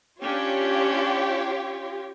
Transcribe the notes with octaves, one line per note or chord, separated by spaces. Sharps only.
C#4 D4 F4 G4 C#5